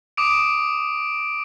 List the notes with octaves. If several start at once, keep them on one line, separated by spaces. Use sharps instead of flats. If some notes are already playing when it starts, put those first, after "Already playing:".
D6 D#6 D7